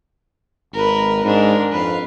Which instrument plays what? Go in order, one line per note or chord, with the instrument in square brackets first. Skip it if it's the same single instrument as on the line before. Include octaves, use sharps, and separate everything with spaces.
[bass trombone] G#1 [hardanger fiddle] A#4 B4
[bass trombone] G#2 [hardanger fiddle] D4 A#4
[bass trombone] F2 [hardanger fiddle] B4 F5